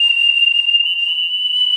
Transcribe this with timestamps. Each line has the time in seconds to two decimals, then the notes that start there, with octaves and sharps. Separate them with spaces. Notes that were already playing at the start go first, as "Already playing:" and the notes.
Already playing: F7
0.85 F#7
0.97 F7
1.09 F#7